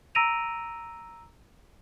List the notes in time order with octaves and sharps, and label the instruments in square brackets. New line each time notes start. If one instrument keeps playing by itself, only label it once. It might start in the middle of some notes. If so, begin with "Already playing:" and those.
[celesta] A#5 E6 A#6 D7 D#7 F7